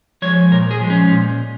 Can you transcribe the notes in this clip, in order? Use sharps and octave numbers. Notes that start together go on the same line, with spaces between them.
F3 G#3 C#5
A#2 A#4
G#4
F3 G#3
C#4
A#2